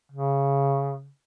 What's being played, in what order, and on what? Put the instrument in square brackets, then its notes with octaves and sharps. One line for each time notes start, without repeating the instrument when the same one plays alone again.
[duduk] C#3